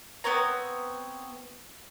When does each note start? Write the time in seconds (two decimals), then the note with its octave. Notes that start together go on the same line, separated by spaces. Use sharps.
0.24 B3 C4 C#5 A#5